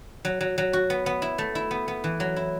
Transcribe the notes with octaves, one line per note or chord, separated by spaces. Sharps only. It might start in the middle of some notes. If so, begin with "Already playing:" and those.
F#3
F#3
F#3
F#4
B3
B3
E4
A3
E4
B3
B3
E3
F#3
E4